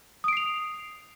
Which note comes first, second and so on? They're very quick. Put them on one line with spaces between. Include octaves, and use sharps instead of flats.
D#6 D7 C7 F7